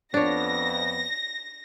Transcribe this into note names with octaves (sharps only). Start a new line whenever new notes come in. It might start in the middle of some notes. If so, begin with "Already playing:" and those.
F2 B3 D4 C#5 A#6